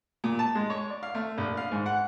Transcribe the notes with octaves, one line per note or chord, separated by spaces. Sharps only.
A#2
A5
G#3
C#5
D5
F5
A3
A#1
F5
G#2
F#5